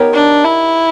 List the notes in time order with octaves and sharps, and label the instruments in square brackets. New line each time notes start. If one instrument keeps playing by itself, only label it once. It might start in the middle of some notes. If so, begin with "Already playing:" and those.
Already playing: [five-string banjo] B3 D#4 G4 A#4 C#5
[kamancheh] D4
E4